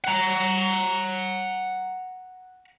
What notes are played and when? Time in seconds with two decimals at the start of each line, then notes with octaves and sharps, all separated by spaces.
0.05 F#5 A#5